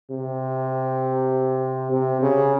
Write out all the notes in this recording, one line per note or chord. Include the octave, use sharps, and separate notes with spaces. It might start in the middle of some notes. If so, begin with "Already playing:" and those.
C3
C3
C#3